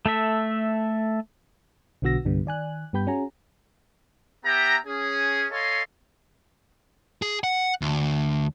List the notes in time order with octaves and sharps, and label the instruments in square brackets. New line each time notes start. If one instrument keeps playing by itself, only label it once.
[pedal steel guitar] A3 A4 E5
[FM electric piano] B1 D3 B3 F#4 E6 A#6
C2 G2 D3 G3 B3
D#3 D5 G#5 F#6
G2 B3 G4 B5 G6
C#4 F#4 G#4 G#5 A#5
[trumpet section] B3 G4 E5 G5 A#5
C#4 G#4
A4 C#5 D#5 F5 G#5 C6
[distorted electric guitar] G#4
F#5
D2